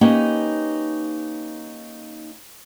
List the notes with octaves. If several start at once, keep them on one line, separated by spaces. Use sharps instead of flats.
A#3 C#4 D#4 G4 B4